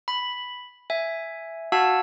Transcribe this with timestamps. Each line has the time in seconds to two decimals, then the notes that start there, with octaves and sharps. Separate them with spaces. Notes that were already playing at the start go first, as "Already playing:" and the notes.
0.08 B5
0.90 E5 G#5
1.72 F#4 F5 F#5 A5 E6